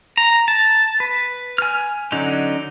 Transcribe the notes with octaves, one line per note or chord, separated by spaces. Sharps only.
A#5
A5
B4
G#5 F6
D3 F#3 C#4 D#4